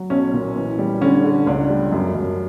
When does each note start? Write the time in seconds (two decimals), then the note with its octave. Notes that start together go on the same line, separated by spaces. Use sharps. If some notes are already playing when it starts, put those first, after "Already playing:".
Already playing: F#3
0.10 B1 C#4
0.34 A#2
0.56 E3
0.79 G3
1.01 D3 C#4
1.24 D3
1.47 C#2 D4
1.70 G3
1.92 F#2
2.15 F#2